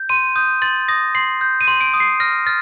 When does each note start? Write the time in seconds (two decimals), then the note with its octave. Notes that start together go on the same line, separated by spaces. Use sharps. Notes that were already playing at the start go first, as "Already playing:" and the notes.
Already playing: G6
0.09 C6 D#7
0.36 D#6 G6
0.62 C6 A6
0.88 D#6 A#6
1.15 C6 C7
1.41 G6
1.61 D#7
1.68 C6
1.81 D7
1.94 D#6
2.00 C7
2.20 F6 A#6
2.46 F6 A6